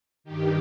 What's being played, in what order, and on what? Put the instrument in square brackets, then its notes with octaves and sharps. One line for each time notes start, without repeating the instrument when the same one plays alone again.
[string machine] G2 D#3 G4